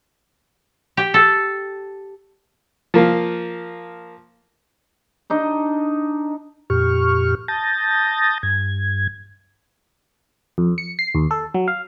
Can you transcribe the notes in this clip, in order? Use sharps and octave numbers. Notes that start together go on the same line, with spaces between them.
G4
A4
F3 A#3
D4 D#4 D#5
F2 A#2 G4 C#6 F6
A5 D#6 G6 A6 A#6
G2 G#6
F2
C#7
C7
D#2
A4
F#3
F5